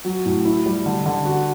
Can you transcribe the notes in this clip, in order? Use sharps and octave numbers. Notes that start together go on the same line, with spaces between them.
F#3
A2
E4
G3
D3
D3
F#4